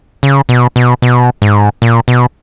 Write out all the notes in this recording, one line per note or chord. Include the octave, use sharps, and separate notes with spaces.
C#3
B2
B2
B2
G#2
A#2
B2